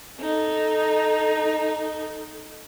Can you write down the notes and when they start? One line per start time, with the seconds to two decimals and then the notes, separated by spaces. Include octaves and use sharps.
0.20 D#4 A4